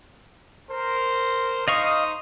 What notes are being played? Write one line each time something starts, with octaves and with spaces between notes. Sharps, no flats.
A#4 C5
D#4 C5 D#5 F5 C#6 D#6